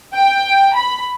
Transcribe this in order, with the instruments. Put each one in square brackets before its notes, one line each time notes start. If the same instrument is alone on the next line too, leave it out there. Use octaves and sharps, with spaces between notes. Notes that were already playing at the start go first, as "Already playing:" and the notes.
[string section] G5
B5